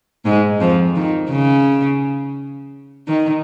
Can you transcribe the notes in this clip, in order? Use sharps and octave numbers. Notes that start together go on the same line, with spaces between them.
G#2 G#3
F2 F3
D#3
C#3
D#3